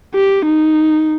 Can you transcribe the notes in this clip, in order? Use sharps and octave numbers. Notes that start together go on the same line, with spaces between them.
G4
D#4